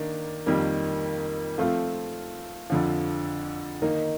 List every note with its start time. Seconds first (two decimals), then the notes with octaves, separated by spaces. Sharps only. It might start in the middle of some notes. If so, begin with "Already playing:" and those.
Already playing: D#3 A#3 D4
0.46 F2 D#3 G3 A#3
1.58 F3 A3 C4 F4
2.70 F2 D3 F3
3.82 D#3 A#3 D#4